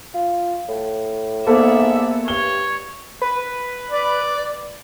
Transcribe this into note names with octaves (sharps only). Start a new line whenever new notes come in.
F4
A2
G#2 A#3 B3 A4 D5 E5
G2 C#5 G7
B4
D5